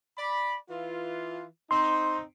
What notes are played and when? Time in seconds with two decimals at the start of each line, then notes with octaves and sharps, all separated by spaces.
0.18 D5 B5
0.70 E3 F4
1.71 C4 D#4 C6